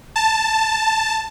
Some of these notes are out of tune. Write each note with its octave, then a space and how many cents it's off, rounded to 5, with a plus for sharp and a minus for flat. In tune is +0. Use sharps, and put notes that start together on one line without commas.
A5 +5